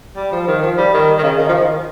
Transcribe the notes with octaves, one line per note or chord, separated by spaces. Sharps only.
G3
F3
D#3
F3
G3
D#3
D#3
C#3
D#3
F3
D#3